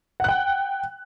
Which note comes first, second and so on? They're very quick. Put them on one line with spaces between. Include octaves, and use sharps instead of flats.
F#5 F#6 G5